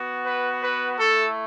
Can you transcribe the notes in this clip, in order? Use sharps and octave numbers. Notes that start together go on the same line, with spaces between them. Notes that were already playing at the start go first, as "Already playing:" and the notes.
Already playing: B3 F#4
B4
B4
A3 E4 A4